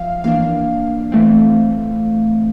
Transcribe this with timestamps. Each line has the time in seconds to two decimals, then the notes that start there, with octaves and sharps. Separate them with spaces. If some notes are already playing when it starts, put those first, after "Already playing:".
Already playing: F3 E5 F5
0.24 E3 A#3 D4 F5
1.12 E3 A3 C4